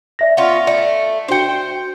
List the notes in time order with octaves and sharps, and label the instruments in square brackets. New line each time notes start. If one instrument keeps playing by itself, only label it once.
[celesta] D5 E5 A#6
[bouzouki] B3 C#4 F4
[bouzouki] A3 [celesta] D5
[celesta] D4 F#4 C#7 [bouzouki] C5 G5